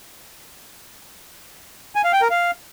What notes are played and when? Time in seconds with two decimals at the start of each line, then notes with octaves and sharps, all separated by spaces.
1.95 G#5
2.04 F5
2.13 G5
2.22 A#4
2.30 F5